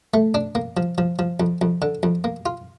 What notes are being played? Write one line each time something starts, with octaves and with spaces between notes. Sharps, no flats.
A3
D4
A#3
F3
F3
F3
F2
F2
D3
F2
A#3
F4